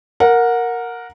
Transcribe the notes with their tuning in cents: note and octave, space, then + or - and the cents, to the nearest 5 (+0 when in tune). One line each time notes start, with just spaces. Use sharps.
A#4 +0 F#5 -20